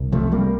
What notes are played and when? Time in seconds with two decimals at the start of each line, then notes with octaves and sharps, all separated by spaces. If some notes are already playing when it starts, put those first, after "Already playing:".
Already playing: C2
0.12 C3 F3 A3
0.32 G3 A#3